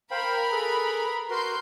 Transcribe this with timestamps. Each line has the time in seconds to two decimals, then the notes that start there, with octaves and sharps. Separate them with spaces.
0.11 A#4 C5 F5 G5 B5
0.51 G#4 A4 B4
1.30 F#4 A#4 B4 C6 G6